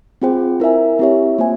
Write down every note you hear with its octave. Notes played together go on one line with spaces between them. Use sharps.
C4 F4 G#4 C5 G5
E4 A#4 E5 G#5
C4 E4 G4 C#5 E5
A#3 F4 C5 E5 G#5